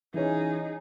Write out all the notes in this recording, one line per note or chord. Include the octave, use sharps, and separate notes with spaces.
E3 C#4 D#4 G#4